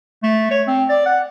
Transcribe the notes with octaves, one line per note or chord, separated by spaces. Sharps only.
A3
C#5
C4
D5
F#5